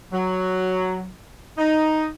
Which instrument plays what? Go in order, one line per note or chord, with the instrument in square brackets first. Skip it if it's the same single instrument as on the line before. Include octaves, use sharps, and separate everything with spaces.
[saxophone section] F#3
D#4